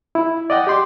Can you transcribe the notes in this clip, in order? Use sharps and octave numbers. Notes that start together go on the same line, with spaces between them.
E4
D5 D#5 F#5 G5
G4 G5 C6 D6